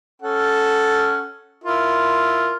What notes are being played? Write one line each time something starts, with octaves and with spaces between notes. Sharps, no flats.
C#4 A4 F#5
E4 F4 A#4